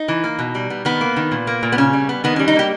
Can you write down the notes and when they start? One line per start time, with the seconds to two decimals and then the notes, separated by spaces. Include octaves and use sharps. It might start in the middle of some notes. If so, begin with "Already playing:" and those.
Already playing: D#4
0.08 E3
0.24 A#3
0.39 B2
0.55 G3
0.70 B3
0.85 D#3 B3
1.01 A#3
1.16 D#3
1.32 A#2
1.47 A#3
1.63 A#2
1.72 B3
1.78 C#3 C#4
1.93 G3
2.09 B3
2.24 D#3 B3
2.36 G3 C#4
2.48 D#4
2.56 A#3 G4